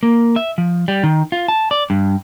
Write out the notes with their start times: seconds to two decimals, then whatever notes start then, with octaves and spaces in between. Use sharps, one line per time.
0.03 A#3
0.36 E5
0.58 F3
0.88 G3
1.03 D#3
1.32 F4
1.48 A5
1.71 D5
1.90 G2